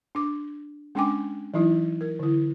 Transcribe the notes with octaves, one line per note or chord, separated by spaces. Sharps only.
D4 D6
G#3 C#4 D4 G5 G#5 D6
E3 F#3 D#4 E4
A#4
D3 E4